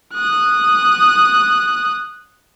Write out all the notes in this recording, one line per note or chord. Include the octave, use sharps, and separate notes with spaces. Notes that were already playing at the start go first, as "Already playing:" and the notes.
D#6 F#6